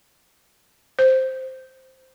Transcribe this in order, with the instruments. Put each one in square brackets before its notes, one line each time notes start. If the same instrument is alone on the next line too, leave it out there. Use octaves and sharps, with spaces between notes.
[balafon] C5